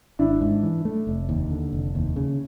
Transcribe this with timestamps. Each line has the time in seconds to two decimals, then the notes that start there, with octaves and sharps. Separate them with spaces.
0.19 G#1 D4 E4
0.41 G#2
0.63 E3
0.85 A3
1.07 F1
1.29 D#2
1.51 D3
1.72 F1
1.95 D#2
2.16 C#3